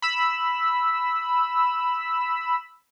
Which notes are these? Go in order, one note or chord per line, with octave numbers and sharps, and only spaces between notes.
B5 E6